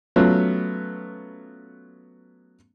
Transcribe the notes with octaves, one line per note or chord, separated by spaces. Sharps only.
F#3 A3 B3 C#4 F4